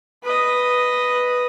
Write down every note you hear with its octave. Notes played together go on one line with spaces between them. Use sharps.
B4 D#5